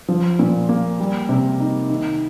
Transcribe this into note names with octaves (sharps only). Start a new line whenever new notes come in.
F3
A#2
A#3
G3
C3
D#4
D#3